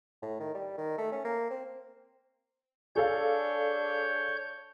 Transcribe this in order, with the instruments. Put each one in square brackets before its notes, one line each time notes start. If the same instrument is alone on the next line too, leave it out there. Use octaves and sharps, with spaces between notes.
[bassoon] A2
D#3
G3
D#3
A3
C#4
A#3
C4
[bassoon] D4 [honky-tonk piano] G#4 A4 F5 [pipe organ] C#5 G6